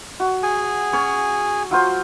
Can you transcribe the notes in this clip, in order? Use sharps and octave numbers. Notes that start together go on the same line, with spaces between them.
F#4
G#4 G#5
C#4 C#5
F#3 F4 C5